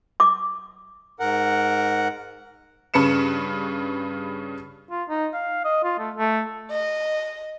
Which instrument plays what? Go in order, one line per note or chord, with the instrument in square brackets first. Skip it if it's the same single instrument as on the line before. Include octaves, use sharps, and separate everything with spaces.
[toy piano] D6
[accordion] G#2 A#4 F#5
[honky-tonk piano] G2 C#3 B4 C#7 E7
[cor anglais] F4
D#4
F5
D#5
F4
A3
A3
[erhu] D#5